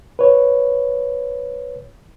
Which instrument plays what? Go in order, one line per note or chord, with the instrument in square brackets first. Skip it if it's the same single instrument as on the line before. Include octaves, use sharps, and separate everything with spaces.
[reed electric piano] B4 C#5